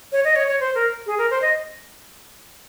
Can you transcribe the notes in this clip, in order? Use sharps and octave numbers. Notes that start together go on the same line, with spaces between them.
C#5
D#5
C#5
C#5
C5
A#4
G#4
A#4
C5
D#5